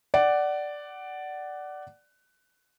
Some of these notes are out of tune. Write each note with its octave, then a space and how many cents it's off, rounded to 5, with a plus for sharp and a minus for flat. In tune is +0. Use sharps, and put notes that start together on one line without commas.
D5 +0 F#5 +20